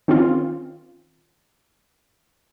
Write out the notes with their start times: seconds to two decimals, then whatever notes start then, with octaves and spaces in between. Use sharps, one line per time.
0.08 D#3 C4 C#4 F4